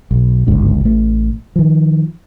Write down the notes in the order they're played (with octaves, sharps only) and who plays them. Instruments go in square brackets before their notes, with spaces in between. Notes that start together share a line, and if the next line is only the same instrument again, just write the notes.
[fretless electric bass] B1
G1 C#2 G#2 D3
A1 A3
D#3 F3